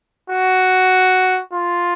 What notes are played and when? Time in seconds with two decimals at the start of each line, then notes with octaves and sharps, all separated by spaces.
0.30 F#4
1.53 F4